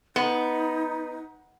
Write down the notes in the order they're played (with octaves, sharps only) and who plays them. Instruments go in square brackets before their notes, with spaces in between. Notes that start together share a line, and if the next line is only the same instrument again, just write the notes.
[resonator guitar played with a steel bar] B3 [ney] D#4